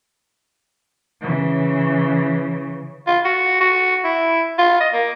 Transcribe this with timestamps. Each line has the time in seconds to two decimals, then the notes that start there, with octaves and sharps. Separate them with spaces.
1.21 C#3 E3
3.07 F4
3.25 F#4
3.61 F#4
4.04 E4
4.58 F4
4.81 D#5
4.93 A#3